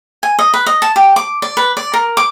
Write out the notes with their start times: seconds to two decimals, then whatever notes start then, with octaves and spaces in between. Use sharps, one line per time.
0.23 G#5
0.39 D#5
0.54 B4
0.66 D#5
0.82 A5
0.96 G4
1.16 D6
1.42 D5
1.57 B4
1.77 D5
1.94 A#4
2.17 D6